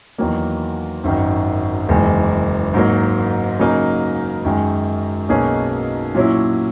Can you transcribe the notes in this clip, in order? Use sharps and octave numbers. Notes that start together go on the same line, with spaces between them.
E2 D#3 F#3 A#3
G#1 F#2 D#3
F#1 E2 D#3 G#3
G#2 F#3 A#3
C#3 F#3 A#3 D#4
F#2 D#3 G#3
B1 B2 A#3 C#4 G#4
A#2 F#3 C#4 E4